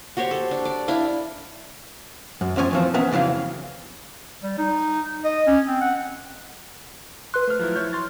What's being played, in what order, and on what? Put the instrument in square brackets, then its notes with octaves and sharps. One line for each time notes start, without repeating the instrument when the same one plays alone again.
[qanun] F#4 G4 C5 C#5
A4
D4
D5
D4 E4 F5
[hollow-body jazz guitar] F#2
E2 F3 C#4 D5 G#5
E3 F3 C4
B3 C#4 B4 E5 A#5
F2 C#3 E3 F#3 F5
[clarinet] G3
D#4
D#5
C#4
C4
F#5
[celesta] B4 F#6 [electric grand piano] C6
[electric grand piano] A3 C5 F6
F3 F#3 E4
E4 C#5 G6
C6 F6 A6